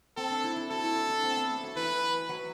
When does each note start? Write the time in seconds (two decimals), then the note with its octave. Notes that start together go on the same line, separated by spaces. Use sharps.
0.17 C4 A4
0.30 D4
0.44 E4
0.56 E4
0.71 F#4 A4
0.84 E4
0.96 D4
1.10 D4
1.23 C4
1.37 B3
1.49 A3
1.63 F#3
1.76 E3 B4
2.29 F#3